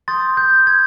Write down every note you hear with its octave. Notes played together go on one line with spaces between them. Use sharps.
C6 D#6 G6 A6
G6
G#6